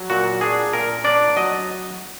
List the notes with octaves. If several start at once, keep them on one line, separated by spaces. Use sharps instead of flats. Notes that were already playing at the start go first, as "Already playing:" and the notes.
Already playing: F#3
A#2 F#4
D4 G#4
A#2 A#4
D4 D5
F#3 D#5